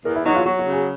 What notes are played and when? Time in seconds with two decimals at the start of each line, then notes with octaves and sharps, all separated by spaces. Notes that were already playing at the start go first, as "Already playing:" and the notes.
0.05 E2 A#4
0.16 E4
0.25 F#3 D#4
0.36 F4
0.46 F#3 F#4
0.59 F#4
0.67 C#3
0.73 G#4